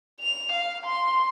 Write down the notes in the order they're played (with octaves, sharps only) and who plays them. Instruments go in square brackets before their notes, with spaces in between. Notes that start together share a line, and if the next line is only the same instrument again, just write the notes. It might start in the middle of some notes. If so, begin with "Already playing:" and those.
[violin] F7
F5
C6